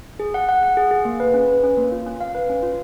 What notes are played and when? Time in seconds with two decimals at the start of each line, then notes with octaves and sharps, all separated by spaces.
0.20 G#4
0.34 F#5
0.49 F#5
0.63 F#5
0.77 G#4
0.91 G#4
1.05 A#3
1.20 B4
1.34 C#4
1.48 B4
1.63 C#4
1.77 A#3
1.92 F4
2.06 C#4
2.21 F5
2.35 B4
2.49 C#4
2.63 F4